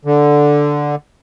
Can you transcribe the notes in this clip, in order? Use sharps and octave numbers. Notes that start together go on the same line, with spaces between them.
D3